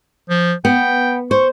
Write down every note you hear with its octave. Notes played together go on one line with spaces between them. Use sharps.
F3
B3 G5
C5 C#6